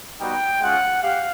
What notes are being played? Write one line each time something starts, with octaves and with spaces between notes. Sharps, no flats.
G3 B3 D#4 F#4 G5
G#3 C#4 F4 F#5
G4 F5